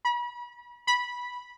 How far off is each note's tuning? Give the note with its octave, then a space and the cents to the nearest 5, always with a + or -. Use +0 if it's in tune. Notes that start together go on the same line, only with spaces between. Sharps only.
B5 -35
B5 -10